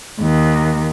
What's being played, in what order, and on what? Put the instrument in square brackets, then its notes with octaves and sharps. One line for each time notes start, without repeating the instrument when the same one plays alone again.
[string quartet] D#2